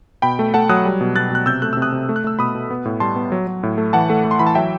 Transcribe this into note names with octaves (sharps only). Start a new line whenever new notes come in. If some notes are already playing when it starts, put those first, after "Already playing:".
B2 G5 B5
A3
A3 F#5 A5
F#3 D#6 F#6
G3
B2
B2 F#6 A6
B2 F#6
C3 E6 G6
A3 F#6
C3 E6
D#6 F#6
C3
A3
F#6
A3 E6
B2 B5 D#6
B2
B3
A2
G3 A5 C6
B3
F#3
F#3
A2
A3
E3 F#5 A5
A3
A3
C6
E3 B5
A5
F#3 E5 G5